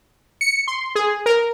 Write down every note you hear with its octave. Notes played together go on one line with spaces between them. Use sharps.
C#7
C6
G#4
A#4